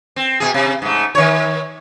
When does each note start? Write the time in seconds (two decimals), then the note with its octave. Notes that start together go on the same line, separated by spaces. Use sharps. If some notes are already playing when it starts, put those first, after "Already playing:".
0.16 C4
0.40 B2 G#4
0.54 C3
0.82 G#2 A3
1.15 D#3 C#5